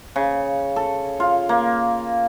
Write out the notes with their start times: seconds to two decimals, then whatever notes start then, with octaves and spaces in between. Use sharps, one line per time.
0.16 C#3
0.76 A4
1.20 F4
1.49 A#3